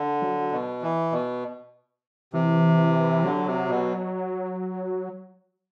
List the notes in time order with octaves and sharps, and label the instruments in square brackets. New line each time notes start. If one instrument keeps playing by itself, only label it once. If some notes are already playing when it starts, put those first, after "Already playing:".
Already playing: [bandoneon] D3
[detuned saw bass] F#3
[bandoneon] B2
E3
B2
[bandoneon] C3 [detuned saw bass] E3
[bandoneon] D3 [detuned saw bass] F#3
[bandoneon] C3
B2